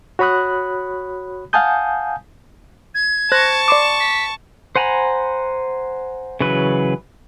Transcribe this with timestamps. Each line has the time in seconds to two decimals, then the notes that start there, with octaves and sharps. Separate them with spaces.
0.19 F#4 C#5 B5 D#6 F#6
1.53 F5 F#5 G#5 A5 D#6 G6
2.95 G#6
3.32 C5 A5 C#6 F#6 A#6
3.68 D5 C6 D6 E7
4.00 B6
4.76 C5 F#5 G#5 A#5 B5
6.40 C#3 E3 F#3 B4